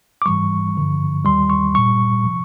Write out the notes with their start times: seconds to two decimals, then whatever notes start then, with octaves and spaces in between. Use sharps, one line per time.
0.22 D6
0.26 G#2 E3 G3 C#6
0.76 G2 D3 F3
1.25 D#2 D#3 G3 C6
1.50 C#6
1.75 A#2 G3 C#6
2.25 C3 F3